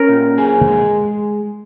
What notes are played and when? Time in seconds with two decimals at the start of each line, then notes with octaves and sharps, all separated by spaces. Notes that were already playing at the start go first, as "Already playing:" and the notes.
Already playing: C#4 A#4
0.09 A#2
0.38 G#4
0.67 G#3